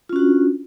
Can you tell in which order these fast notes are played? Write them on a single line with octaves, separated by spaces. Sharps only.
F4 C#4 F#4 D4